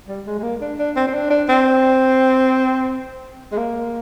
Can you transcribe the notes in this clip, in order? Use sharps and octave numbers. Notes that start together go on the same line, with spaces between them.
G3
G#3
G#3
A#3
D4
D4
C4
C4
D4
D4
C4
G#3
A#3